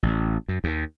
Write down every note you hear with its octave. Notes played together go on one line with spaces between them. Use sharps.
A1
F#2
D#2